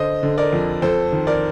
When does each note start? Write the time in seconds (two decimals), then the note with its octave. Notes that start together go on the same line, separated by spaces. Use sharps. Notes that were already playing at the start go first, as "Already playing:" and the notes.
Already playing: D3 C5 D#5
0.23 D3
0.38 A#4 D5
0.53 F2
0.82 F2 A4 C5
1.12 D#3
1.27 A#4 D5